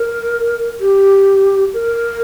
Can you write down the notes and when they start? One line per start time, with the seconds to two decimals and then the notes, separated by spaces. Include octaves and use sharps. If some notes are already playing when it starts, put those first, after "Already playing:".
Already playing: A#4
0.81 G4
1.74 A#4